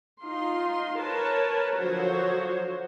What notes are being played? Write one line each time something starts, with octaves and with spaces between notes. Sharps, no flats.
D#4 F4 C6
A#4 B4 C#5 A5
D3 F3 F#3 F#4 C5 C#5